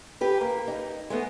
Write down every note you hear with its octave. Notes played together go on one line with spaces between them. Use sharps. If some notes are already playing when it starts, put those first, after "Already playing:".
G4 B4
A#3
D#4
G#3 A3 B3